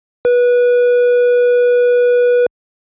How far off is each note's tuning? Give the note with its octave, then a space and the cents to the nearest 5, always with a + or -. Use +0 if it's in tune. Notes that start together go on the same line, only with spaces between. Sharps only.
B4 -20